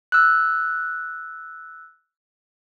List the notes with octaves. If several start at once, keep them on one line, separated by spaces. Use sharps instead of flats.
E6 F#6